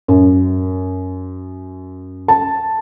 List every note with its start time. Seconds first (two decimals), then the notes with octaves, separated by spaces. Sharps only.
0.08 F#2
2.28 A5